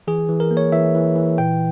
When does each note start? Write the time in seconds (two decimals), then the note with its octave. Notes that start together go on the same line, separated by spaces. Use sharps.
0.07 E3 G#4
0.29 E3
0.40 A#4
0.51 A#3
0.57 C#5
0.72 E3 E5
0.95 E3
1.16 E3
1.38 A#2 G5